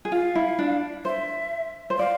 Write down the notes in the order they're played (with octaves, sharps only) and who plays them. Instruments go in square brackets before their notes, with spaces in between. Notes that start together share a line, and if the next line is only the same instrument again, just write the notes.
[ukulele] G#4
[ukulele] F4 [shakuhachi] F5
[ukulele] E4
D4
[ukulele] C5 [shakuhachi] E5
[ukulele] C5
[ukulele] D5 [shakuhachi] F5